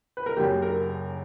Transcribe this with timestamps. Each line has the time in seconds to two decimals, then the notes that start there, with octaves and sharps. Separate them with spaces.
0.17 B4
0.26 A#4
0.37 F#1 F#2 C#3 F#3 G4
0.62 A#4